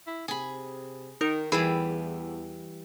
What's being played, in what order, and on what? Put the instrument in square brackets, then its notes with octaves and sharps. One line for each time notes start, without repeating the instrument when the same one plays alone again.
[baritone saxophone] E4
[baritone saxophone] C3 [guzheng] G#4 B5
[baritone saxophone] D#3 [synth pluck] D#4 A#4
[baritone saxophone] E2 [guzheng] E3 G3 [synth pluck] G#4 B5 E6